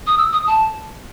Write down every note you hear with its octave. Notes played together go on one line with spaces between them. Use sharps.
D#6
E6
D#6
A5